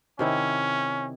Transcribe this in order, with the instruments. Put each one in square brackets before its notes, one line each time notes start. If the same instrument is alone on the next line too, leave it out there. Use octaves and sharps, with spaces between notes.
[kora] C3 D#3 E4 [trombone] C#4